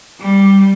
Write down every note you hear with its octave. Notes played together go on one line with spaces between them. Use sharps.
G3